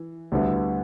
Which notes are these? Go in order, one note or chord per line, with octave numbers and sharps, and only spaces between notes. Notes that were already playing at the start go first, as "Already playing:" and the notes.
Already playing: E3
D2 D3 G3 B3 E4